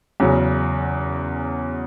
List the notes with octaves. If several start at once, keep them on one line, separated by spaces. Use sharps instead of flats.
E2 C#3 F#3